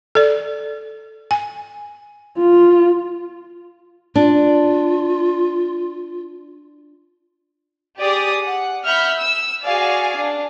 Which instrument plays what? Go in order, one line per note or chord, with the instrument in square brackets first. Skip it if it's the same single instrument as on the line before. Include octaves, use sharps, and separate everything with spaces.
[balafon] A4 D5
G#5
[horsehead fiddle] F4
[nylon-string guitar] D4 [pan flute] F4
[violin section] G4 G#4 D5 D#6
F#5
E5 F#5 B5 F6 G6
E6
F#4 G#4 D5 F5 G#5
D4